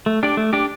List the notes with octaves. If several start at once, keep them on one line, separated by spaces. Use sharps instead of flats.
A3
D4 G4 D5
A3
D4 G4 D5